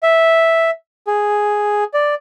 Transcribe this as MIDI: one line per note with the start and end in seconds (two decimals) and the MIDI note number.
0.03 0.70 76
1.07 1.84 68
1.94 2.15 74